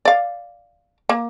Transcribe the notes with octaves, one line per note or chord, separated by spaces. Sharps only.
D5 F5
A#3